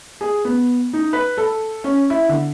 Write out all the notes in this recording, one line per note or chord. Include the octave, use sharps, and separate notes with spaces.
G#4
B3
D#4
B4
A4
C#4
E4
D3